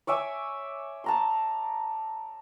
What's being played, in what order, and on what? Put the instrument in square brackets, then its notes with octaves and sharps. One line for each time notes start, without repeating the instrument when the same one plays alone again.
[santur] C#5 D5 E5 G#5
A5 A#5 C6